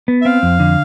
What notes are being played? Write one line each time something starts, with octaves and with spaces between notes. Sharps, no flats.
B3
E5
C4 F5
F2
D3